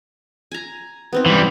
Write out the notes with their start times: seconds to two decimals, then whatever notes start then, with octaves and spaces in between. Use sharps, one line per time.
0.52 G#5 A#5
1.13 B3 C4 D#4
1.26 E3 G3